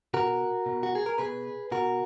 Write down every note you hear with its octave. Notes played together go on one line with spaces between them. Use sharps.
B2 F#4 A#4
B2
F#4
G#4
A#4
B2 G#4 B4
B2 F#4 A#4